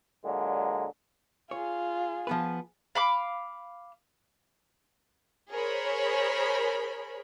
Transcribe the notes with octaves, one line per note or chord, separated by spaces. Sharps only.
A#2 D3 F#3 G#3
F4 G#4 C#5
F3 B3 B4
F5 B5 D6
G#4 A#4 C5 C#5 B5